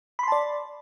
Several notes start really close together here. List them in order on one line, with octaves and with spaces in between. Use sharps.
B5 C6 A5 D5